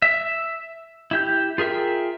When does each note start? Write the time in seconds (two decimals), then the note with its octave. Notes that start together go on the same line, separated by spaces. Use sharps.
0.02 E5
1.11 E4 G4 G6
1.58 F4 G#4 A#4 E5 G5